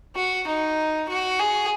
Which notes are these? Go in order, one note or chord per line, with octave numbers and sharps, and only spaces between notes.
F#4
D#4
F#4
G#4